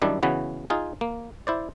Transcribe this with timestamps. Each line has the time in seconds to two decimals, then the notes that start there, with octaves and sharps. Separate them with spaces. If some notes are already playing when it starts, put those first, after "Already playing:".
0.02 F#2 D#3 G3 D4 E4
0.23 C#3 E3 B3 F#4
0.70 D#4 F4 G#4
1.01 A#3
1.47 E4 C5 D5